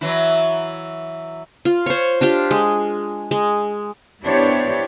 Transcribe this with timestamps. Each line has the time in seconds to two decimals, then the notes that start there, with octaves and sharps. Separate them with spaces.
0.01 E3 F#3 E4
1.65 F4
1.86 C5 C#5
2.21 D4 F4 G4
2.51 G#3
3.31 G#3
4.23 B3 D4 E4 G4 C5 C#5